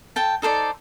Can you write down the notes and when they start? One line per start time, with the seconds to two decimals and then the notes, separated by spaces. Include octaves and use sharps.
0.16 A4 G5 A5
0.42 D#4 A4 C5 D5